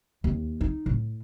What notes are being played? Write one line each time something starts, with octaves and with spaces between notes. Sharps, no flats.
D#2
D#4
A2